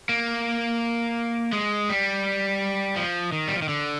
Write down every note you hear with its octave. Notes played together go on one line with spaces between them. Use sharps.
A#3
G#3
G3
F3
D#3
G3
F3
D#3
D3